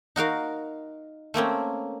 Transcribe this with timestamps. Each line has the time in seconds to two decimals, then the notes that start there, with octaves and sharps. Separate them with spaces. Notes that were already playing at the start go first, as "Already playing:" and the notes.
0.16 D#4 F#4 A#4 F5
1.34 A3 A#3 C4 C#4